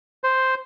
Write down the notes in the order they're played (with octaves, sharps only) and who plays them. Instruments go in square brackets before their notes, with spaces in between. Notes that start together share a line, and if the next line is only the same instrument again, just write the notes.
[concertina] C5